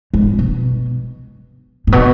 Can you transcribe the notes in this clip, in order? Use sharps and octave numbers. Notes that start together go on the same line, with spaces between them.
G#2
B2
A2
B2